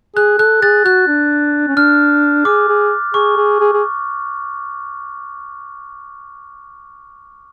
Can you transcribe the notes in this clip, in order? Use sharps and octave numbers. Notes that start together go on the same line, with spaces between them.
G#4 F#6
A4 F#6
G#4 F#6 A6
F#4 F#6
D4
C#4
D4 F6
G#4 D6
G#4
G#4 C#6
G#4
G#4
G#4